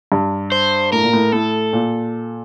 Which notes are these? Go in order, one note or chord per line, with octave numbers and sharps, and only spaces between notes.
G2
C5
A2 A#4
A#2
A2
A2 A4
A#2